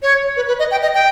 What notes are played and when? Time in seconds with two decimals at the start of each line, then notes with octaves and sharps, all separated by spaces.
0.02 C#5
0.37 B4
0.48 B4
0.59 D#5
0.71 G5
0.82 D#5
0.94 G5